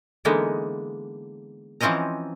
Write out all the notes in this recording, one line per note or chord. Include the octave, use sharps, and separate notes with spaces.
D3 E3 G#3 A#3 B3 D#4
E3 F3 C4 C#4 D#5 A#5